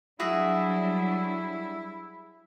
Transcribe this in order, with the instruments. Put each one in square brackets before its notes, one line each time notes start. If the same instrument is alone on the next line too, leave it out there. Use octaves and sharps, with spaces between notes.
[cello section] F#3 G3 D4 [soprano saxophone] E4 [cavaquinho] F#4 G#4 E5